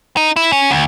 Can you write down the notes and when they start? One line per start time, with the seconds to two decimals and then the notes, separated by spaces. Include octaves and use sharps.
0.17 D#4
0.36 E4
0.52 C#4
0.71 D2